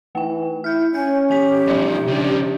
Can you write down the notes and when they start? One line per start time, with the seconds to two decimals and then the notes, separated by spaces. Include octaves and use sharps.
0.15 E3 A3 G5
0.64 E4 F6 G6
0.95 C#4 G#5 G6
1.30 E3 G4 G#5 B6
1.68 G2 B2 F3 D#4 E5
2.08 C#3 G3 D4